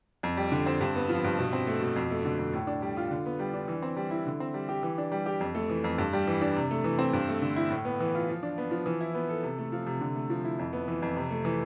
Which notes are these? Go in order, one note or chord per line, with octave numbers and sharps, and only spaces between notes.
F2
G3
D3
C4
G2
B3
F3
G2
B2
C4
A3
B2
F2
A3
D3
F2
A2
D4
G3
F4
D3
B3
G3
D4
E3
C4
G3
E4
D3
C4
G3
G4
E3
D4
G3
G4
F2
A3
E3
F2
G2
G3
E3
D4
C3
A3
E3
C4
G2
A3
D3
E4
A2
B3
E3
F4
F3
D4
B3
F3
E3
E4
B3
A4
C3
A3
F3
C3
D3
A3
F3
E4
F2
B3
E3
F2
C3
A3
E3